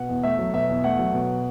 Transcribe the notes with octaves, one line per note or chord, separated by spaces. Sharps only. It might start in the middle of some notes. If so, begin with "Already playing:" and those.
Already playing: B2 F#5
E2
A3 E5
F#3
B2 E5
E2
A3 F#5
F#3
B2